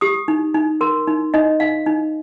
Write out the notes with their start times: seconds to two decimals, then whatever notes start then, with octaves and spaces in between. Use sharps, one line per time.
0.01 G4 D#6
0.28 D#4
0.54 D#4
0.81 A#4 C6
1.07 D#4
1.34 D#4 D#5
1.60 D#4 F5
1.86 D#4